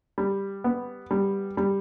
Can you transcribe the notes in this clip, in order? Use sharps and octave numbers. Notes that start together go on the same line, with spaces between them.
G3
B3
G3
G3